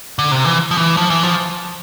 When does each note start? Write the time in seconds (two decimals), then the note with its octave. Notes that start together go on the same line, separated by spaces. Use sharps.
0.19 D3
0.32 C3
0.45 E3
0.71 F3
0.77 E3
0.97 F3
1.10 E3
1.23 F3